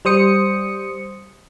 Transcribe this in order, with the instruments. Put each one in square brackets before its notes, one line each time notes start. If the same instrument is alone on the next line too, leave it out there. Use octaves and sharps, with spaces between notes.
[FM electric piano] G3 C5 D#6 C#7